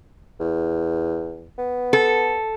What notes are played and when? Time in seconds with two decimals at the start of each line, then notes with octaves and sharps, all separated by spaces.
0.40 E2
1.58 B3
1.93 A4